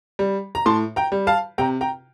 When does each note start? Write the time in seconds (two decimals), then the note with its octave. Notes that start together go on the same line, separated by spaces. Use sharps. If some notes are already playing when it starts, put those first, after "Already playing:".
0.19 G3
0.55 A#5
0.66 A2 A5 C6
0.96 G5 A#5
1.12 G3
1.27 F5 A5
1.58 C3 G5 A#5
1.81 G5 A#5